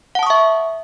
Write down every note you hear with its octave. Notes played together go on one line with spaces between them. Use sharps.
E5 F#5 A5 C#6 D#6